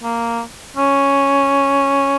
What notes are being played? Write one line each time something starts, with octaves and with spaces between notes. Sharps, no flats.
A#3
C#4